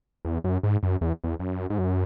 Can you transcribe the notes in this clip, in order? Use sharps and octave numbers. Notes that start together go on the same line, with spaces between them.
E2
F#2
G#2
F#2
E2
E2
F#2
G#2
F#2